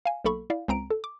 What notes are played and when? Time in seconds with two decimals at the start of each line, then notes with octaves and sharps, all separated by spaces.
0.05 F5 G#5
0.24 B1 A#3 A4 B5 C#6
0.50 E4 D5 F5
0.68 C#2 C4 A#5 D7
0.91 A4
1.04 D6